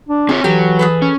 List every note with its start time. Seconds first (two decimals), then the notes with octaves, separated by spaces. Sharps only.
0.09 D4
0.29 C4 F4 G#4 C#5
0.44 E3 F#3 G4 A4
0.79 G#4 A4 B4
1.02 C#4